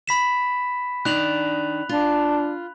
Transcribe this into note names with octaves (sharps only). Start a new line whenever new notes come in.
B5 B6 E7
D#3 D4 D#4 F#6 F7 F#7
D4 F4